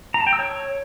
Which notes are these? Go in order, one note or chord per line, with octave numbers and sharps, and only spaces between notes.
A#5
A5
G5
E6
C#5